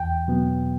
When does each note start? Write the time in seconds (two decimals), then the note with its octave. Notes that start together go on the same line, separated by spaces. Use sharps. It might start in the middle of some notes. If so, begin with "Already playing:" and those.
Already playing: E2 G5
0.28 B2 F#3 B3